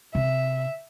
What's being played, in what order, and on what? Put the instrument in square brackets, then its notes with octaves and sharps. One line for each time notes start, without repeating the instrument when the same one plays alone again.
[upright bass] C3 [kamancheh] E5